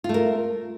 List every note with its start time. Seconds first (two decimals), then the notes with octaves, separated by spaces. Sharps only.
0.04 F4
0.09 A3
0.14 A#4